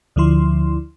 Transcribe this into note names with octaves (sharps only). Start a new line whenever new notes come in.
D2 D3 F3 E4 C6